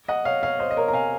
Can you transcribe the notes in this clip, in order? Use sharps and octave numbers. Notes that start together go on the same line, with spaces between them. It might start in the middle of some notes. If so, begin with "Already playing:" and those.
D#5 F#5
C#5 F5
C#5 F5
C5 D#5
D#5
A#4 C#5
A#5
F5 G#5